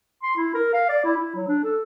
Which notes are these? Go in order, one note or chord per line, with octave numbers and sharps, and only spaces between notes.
C6
E4
A#4
F5
D5
E4
E4
F#3
D4
A4